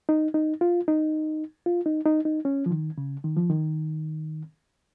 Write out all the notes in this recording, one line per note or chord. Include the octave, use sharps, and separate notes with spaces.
D#4
D#4
F4
D#4
F4
D#4
D#4
D#4
C#4
F3
D#3
C#3
D#3
F3
D#3